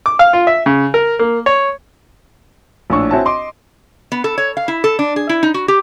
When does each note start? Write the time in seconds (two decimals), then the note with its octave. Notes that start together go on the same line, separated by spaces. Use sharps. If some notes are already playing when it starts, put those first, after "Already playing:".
0.06 D6
0.19 F5
0.33 F4
0.47 E5
0.66 C#3
0.94 A#4
1.19 A#3
1.46 C#5
2.90 A#1 A2 D4 C#5 C#6 E6
3.11 C4 E4 F#4 C#5 G#5 A5
3.25 D#5 C6 D6
4.12 B3
4.24 A4
4.38 C#5
4.57 F5
4.68 E4
4.84 A4
4.99 D4
5.16 G#4
5.29 E4
5.43 D#4
5.54 F#4
5.68 G4